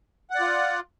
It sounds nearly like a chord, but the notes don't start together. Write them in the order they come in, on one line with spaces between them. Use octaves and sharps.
F#5 D5 F4